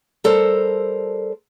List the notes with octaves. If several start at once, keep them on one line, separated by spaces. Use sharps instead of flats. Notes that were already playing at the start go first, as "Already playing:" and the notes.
G3 A4 A#4 C5